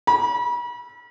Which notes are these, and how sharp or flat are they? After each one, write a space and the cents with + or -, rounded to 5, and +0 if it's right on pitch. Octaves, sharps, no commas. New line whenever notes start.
B5 -40